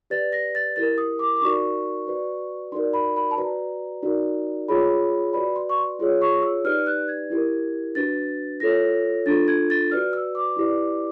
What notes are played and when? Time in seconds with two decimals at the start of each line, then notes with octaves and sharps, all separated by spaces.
0.10 G4 B4 D5 A6
0.33 A#6
0.55 A6
0.76 E4 G4 A#4 A6
0.98 D#6
1.19 D6
1.37 D6
1.41 D#4 F#4 A#4 D5 C#6
2.07 F#4 B4 D5
2.72 D#4 F#4 A#4 D5 C6
2.93 B5
3.16 B5
3.31 A5
3.37 F#4 B4 D5 A#5
4.02 D#4 F#4 A#4 D5
4.68 F4 G#4 C#5 B5
5.33 F#4 B4 D5 B5
5.56 C6
5.69 C#6
5.77 C6
5.99 F4 G#4 C#5 C6
6.21 C#6
6.42 E6
6.65 D#4 G4 B4 D5 F6
6.86 F#6
7.08 G#6
7.30 E4 G4 A#4
7.95 D4 F#4 B4 A6
8.60 F4 A4 C#5 A#6
9.26 D4 F4 A4 A6
9.48 G#6
9.70 A6
9.91 F#4 B4 D5 F6
10.13 E6
10.35 D6
10.56 E4 G4 B4 D5